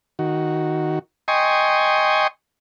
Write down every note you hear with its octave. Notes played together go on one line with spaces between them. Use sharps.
D#3 F#4
D#5 G5 G#5 C6 C#6 D#6